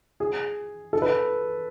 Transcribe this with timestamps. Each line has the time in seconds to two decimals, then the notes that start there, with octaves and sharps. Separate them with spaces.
0.20 G#4
0.93 A4
1.02 B4